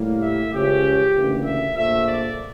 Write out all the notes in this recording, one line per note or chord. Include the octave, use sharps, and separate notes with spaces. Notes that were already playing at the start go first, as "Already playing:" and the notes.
Already playing: A2 G3 A#3
E5
C#2 C#3 F3 C#4 G4
D2 C#3 E3 A#3
E5
A#1 A#2 F3 A3 E5
D5